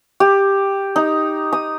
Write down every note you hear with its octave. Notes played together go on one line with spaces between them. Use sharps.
G4
D#4
D#6